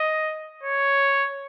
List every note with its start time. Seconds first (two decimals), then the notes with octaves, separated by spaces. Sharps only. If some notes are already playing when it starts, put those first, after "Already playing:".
Already playing: D#5
0.63 C#5